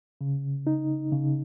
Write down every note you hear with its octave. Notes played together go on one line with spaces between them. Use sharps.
C#3
D#4
C#3